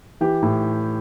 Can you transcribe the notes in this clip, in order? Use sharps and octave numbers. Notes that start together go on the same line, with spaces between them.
E3 G4
A2